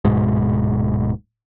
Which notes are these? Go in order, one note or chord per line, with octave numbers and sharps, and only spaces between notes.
D1 G#2 B2 G#3